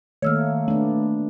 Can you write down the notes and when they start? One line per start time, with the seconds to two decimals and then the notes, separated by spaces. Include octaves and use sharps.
0.22 D#3 A3 A#3 C#5 E6 F6
0.68 A3 B3 D4